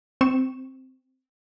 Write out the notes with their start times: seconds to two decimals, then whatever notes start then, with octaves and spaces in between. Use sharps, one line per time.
0.21 C4 C#6 E7